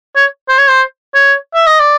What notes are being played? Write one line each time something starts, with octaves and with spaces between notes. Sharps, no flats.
C#5
C5
C#5
C5
C#5
E5
D#5
D5